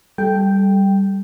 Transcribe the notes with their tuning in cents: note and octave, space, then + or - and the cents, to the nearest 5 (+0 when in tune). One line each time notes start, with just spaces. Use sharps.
G3 +0 A4 -15 G5 +0